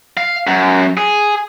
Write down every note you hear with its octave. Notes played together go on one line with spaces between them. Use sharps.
F5
F#2
G#4